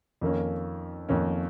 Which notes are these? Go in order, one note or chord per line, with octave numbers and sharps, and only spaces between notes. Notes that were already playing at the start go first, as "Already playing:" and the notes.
F2 D#3 A#3 C#4
F2 D#3 A#3 C#4